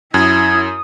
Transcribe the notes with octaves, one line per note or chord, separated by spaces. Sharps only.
F#2 E4 D#6 G#6